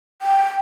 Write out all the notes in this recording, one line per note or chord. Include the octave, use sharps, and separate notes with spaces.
G5